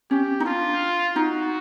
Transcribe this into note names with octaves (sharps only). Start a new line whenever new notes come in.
C#4 G4
D#4
D4 F4
D#4 F#4